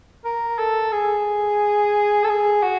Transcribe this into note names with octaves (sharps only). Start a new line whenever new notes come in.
A#4
A4
G#4
A4
G#4
F#4